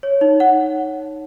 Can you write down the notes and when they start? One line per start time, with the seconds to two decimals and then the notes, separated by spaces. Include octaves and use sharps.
0.03 C#5
0.21 D#4
0.40 F#5